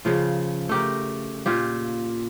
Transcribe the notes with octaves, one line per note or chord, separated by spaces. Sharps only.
C#3 F3 F4
A3 G4 A#4
A#2 F4 G4